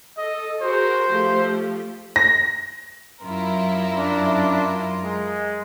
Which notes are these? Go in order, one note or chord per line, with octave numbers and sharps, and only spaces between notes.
A4 D#5
F#4 G#4 A#4 C5
F3 A3 G4
A#6
F#2 E4 F4 A#4
D4
G#3